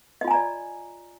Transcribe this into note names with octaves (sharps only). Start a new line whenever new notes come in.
F4 D5 D#5 G#5 A#5